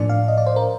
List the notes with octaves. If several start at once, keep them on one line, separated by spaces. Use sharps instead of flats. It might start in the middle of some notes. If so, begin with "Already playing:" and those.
Already playing: A2 F3 A#3 D4 D5
F5
D#5
D5
C5
A#4